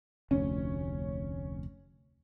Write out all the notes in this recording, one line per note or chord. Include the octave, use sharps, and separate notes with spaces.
F1 D2 C#4